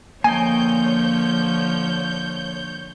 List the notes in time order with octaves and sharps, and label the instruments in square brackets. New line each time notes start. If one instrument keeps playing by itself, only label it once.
[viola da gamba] D3 F3 [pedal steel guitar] A#3 D#5 G5 [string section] C#5 G6 [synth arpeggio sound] G#5